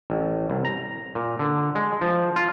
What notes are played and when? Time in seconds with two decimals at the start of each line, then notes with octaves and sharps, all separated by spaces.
0.10 A1
0.50 C2
0.65 A#5
1.15 A#2
1.39 D3
1.75 G#3
2.01 F3
2.36 F4